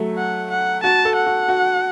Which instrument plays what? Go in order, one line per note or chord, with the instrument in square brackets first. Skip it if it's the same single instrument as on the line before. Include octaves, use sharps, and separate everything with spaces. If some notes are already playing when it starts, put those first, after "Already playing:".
Already playing: [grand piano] F#3 A3
[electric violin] F#5
F#5
[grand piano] F#4 [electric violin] A5
[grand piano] A4
[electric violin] F#5
[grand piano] F#4
F#4